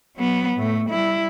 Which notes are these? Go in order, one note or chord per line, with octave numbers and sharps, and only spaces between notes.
F#3 B3
A2 A3
G3 E4